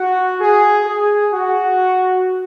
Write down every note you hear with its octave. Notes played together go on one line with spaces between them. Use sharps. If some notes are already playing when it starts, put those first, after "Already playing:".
Already playing: F#4
G#4
G#4
F#4